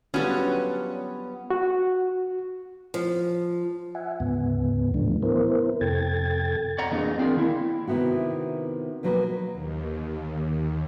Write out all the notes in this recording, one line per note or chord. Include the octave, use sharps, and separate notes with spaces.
F#3 G3 B3 C#4 D4 F4 A4 B4
F#4
F3
E5 F#5 G#5
D2 G#2 C#3 B3
A2 C#3 E3 F3 A3 D4
B3 E4 A#4 C5
F2 C3 A4 G5 G#6 A6
D5 F#5 A#5
E3 A3 A#3 D4 G#4 D#5
C4 D4 F4 G#4 A#4
D#3 A#3 E4
C3 D#3 B3 E4 F#4
B2 F3 F#3 A#3 B4
D#2